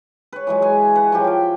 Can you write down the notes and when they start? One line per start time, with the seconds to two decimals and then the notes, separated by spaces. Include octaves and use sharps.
0.33 B4 C#5
0.47 E3 F#3 G#3
0.62 G#4 B4 G#5
0.95 B4 F#5
1.12 F3 F#3 G4
1.24 F5 G5